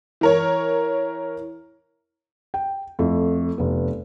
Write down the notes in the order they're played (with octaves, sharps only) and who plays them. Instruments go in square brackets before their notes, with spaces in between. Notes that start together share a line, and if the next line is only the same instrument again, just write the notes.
[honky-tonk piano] E3 A#4 C#5
[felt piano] G5
F2 A3 E4
F1 B3